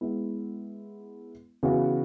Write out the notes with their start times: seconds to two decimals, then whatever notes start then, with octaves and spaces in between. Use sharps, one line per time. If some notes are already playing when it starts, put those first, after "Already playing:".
0.01 G#3 B3 E4
1.63 C#3 E3 B3 F#4 B4